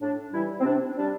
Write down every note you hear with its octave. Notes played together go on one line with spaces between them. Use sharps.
A2 D4
E3 G3 E4
C4
C3 D4
G3 D4